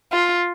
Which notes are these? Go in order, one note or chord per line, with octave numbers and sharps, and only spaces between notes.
F4